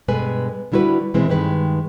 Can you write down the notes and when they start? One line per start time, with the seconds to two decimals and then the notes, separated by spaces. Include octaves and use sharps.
0.08 G2 B2 G#3 A4 B4 G#5
0.72 D3 G3 E4 F#4 B4
1.14 B2 E3 G#3 C4 E4 B4
1.28 G2 D#3 G#3 B4